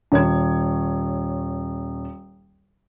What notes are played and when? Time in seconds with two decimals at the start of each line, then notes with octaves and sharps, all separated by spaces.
0.12 D#1 C#5 G#6